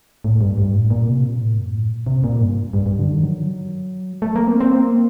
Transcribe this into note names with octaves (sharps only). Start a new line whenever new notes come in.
A2
G2
G2
A2
A#2
C3
A#2
A2
F#2
A2
A#2
C3
A#2
G2
G2
G2
D3
D#3
F#3
A3
A#3
C4
C4
A#3